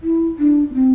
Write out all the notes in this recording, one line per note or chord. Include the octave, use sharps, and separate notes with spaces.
E4
D4
B3
C4